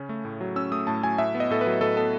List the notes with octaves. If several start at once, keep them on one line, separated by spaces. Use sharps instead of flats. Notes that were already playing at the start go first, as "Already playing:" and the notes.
Already playing: C#3 C#4
A3
A2
F#3
C#4 E6
A3 D#6
A2 A5
F#3 G#5
A2 E5
B3
D#5
A2 A4
B4
F#3
A2 A4
B3 A4